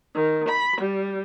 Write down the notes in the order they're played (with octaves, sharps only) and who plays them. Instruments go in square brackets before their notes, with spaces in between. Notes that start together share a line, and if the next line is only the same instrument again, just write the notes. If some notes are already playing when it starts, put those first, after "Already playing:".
[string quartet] D#3
B5
G3